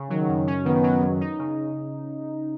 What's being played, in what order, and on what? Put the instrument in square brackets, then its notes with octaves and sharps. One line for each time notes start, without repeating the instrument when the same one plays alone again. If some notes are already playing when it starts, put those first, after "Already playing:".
Already playing: [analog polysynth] C#3
[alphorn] D#3 [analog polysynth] F#3
[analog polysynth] F#2
C#4
[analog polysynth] D#3 [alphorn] B3
[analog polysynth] F#3
F#2
D#4
C#3